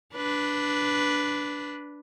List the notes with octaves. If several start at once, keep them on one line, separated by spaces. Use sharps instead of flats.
D4 B4